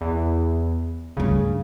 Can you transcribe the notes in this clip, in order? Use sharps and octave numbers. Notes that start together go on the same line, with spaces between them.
E2
D2 G2 C#3